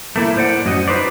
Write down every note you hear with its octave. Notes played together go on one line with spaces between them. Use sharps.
A3 A#3 E4
A2 C5 D5 F#5
F#2 F#4 D#5
D#4 B4 C5 D5